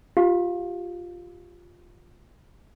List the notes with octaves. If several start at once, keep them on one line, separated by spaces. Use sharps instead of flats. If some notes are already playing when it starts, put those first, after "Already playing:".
F4 G4 F5